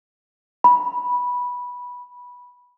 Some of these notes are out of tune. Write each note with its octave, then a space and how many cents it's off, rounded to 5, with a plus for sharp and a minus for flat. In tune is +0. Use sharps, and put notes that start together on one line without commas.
B5 -10